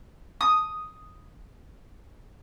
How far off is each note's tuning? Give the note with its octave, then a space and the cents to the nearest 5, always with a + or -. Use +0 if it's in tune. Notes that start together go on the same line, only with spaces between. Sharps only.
D#6 +0